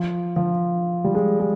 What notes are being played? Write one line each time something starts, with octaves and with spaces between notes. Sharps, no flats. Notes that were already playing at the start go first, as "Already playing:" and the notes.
Already playing: F3
F3
G3
G#3
G#3